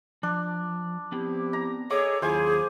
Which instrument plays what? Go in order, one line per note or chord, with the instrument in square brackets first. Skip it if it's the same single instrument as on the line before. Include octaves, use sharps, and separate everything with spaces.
[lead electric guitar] F3 [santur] D4
[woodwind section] F3 E4 G4 [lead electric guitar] B3 C4
[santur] A#5
[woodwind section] G#4 A4 [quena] C#5 [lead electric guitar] D#5 F#5 [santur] D6
[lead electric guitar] D#2 [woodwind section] F#3 E4 F4 [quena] G#4 [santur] C5 F5 G#5